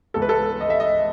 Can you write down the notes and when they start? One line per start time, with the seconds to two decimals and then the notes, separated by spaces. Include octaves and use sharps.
0.14 C#2 C#3 E3 A4
0.22 B4
0.29 A4
0.60 D#5
0.70 E5
0.80 D#5